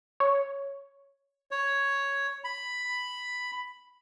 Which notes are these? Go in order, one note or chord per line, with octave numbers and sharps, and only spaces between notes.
C#5
C#5
B5